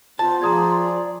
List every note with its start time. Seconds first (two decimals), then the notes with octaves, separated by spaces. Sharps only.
0.19 B3 F4 C5 A5
0.42 F3 G#4 D5 A#5 D#6 G#6